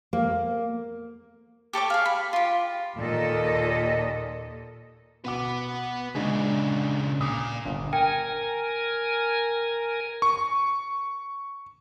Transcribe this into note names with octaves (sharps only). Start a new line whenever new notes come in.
A#3
G4 A4 C#5 D6
G#4 F5
B5
F4 G4
D#2 A#2 A4 D#5
B2 B4 F#5 D6
A#2 C#3 G#3 D4
A#2 D6 D#6
G1
A#4 G5 G#5
C#6